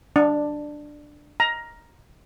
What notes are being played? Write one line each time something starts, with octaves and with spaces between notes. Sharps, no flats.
D4
A#5